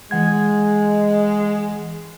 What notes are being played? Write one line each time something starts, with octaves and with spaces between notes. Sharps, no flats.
E3 G#3 F#5 G#6